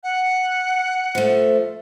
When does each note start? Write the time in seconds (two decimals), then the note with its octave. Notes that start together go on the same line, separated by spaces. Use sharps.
0.03 F#5
1.15 F3 A3